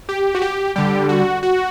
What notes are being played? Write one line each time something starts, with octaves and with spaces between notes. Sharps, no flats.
G4
F#4
G4
D3 G3 G4
F#4
F#4